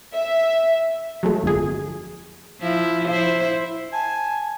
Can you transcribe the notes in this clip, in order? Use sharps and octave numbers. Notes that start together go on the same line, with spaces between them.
E5
F#3 G#3 A3
G1 F2 G#4
F3 E4
E4 C5
G#5 A5